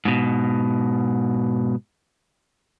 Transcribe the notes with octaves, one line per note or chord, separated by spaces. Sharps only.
G#2 B2